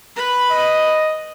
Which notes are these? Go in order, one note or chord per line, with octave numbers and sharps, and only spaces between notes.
B4 B5
D#5